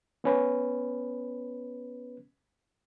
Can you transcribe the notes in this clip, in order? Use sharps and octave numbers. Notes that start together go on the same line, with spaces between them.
B3 C#4 B4